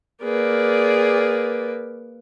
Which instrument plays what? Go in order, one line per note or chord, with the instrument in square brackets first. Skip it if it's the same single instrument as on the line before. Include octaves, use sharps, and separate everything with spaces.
[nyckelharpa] A#3 B4 [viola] G#4 D5